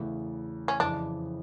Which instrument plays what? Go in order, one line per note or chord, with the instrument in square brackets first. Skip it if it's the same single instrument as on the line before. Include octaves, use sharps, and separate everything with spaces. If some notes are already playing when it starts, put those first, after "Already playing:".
Already playing: [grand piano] E2 C#3 E3 A3
[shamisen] C#4
[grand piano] F2 C#3 E3 [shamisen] D4